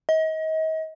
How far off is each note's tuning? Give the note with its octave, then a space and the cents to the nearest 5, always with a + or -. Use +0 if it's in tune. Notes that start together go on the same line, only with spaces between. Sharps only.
D#5 +35